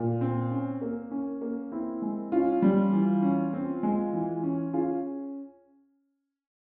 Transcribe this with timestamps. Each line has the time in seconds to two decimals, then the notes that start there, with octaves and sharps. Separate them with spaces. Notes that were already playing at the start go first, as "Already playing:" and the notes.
Already playing: A#2
0.21 C4
0.51 C#4
0.81 A#3
1.11 C#4
1.41 A#3
1.72 C4 E4
2.02 G#3
2.32 C#4 F4
2.62 G3
2.92 E3
3.22 C#4
3.53 C4
3.83 G#3
4.13 E3
4.43 C#4
4.73 C#4 F4 G#4